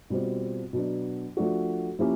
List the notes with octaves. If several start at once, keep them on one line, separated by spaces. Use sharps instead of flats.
B2 G3 C4 F4
B2 F#3 B3 D4
F3 A3 D4 F#4
F3 A#3 C#4 E4 G4